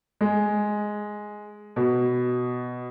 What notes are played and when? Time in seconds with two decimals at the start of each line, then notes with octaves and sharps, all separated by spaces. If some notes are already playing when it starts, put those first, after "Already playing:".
0.21 G#3
1.76 B2